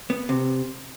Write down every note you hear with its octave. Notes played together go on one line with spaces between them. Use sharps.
B3
C3